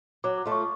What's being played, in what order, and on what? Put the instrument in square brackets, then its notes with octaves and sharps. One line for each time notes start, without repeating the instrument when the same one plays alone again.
[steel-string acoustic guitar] F#3 [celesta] D6
[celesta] D6
[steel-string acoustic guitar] A3 F4
[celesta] C#6